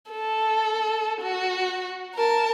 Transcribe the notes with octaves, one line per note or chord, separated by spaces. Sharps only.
A4
F#4
A#4 A5